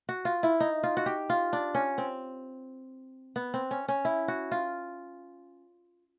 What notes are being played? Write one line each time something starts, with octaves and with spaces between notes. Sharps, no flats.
F#4
F4
E4
D#4
F4
F#4
G4
F4
D4
C#4
C4
B3
C4
C#4
C#4
E4
F#4
F4